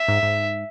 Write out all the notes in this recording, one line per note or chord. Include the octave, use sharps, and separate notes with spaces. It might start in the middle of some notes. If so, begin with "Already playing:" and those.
Already playing: E5
G#2
G#2